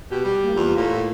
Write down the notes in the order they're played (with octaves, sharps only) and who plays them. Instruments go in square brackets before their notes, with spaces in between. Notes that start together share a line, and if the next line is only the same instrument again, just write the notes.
[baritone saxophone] B2 [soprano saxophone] G4
[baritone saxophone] G3
[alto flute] A#3
[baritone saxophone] E2 [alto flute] F4
[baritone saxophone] A2 [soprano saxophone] A#3